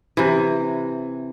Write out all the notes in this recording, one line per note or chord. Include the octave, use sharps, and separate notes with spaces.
C3 E3